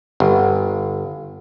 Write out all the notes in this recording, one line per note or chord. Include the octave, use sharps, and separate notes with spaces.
G1